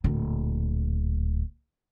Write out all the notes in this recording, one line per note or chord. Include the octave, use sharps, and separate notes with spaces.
D1 A#2